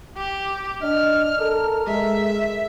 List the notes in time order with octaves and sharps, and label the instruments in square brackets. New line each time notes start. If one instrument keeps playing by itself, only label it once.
[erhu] G4
[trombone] D4 [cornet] D#5 [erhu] F6
[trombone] A4 [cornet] A#4
[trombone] G#3 [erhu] E5